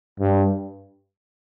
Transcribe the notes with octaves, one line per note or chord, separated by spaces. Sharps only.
G2